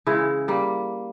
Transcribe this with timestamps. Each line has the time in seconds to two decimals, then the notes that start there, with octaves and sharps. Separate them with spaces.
0.07 C#3 E3 G#3 E4
0.48 G3 A#3